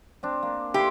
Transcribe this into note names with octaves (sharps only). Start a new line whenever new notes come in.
C4 D4
A#3
E4 G4 C6